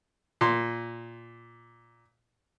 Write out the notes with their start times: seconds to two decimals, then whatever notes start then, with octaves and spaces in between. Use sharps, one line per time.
0.41 A#2 C6